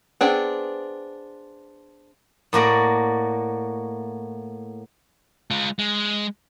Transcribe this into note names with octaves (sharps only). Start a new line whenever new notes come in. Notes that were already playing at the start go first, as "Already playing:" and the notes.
B3 C4 D4 G#4
A2 A#3 F#4 D5
G#3 F4
G#3